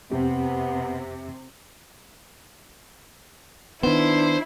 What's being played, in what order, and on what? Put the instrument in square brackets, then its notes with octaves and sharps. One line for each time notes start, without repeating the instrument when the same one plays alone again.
[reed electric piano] F2 C4 G4 [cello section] C3 [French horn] B3
[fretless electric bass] D#3 B3 [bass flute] D4 [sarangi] E4 [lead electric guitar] C5